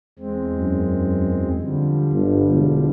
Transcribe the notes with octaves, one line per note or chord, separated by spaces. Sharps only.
E2 G#3 C4
F#2
D3 F3 G3
G1
E1